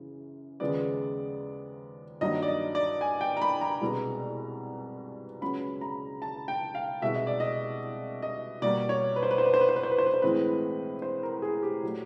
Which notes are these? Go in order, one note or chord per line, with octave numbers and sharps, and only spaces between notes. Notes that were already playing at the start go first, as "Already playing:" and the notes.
Already playing: F#2 C#3 E3
D#2 C#3 F3 G#3 B3 D5
G2 D#3 F#3 A#3 D#5
D5
D#5
D5
G#5
G5
A#5
B5
A#5
C2 B2 G#3 B3
C#2 C#3 F#3 B3 B5
A#5
A5
G5
F5
C2 B2 G#3 E5
D#5
D5
D#5
D#5
B2 G3 A#3 D5
C#5
B4
C5
B4
C5
B4
C5
B4
C5
B4
C5
B4
C5
B4
C5
A2 E3 G#3 C4 B4
C5
A#4
G#4
G4
A#2 F#3 A3